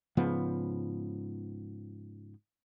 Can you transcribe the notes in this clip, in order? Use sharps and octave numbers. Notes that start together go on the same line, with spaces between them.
G#2 C#3 F3 B3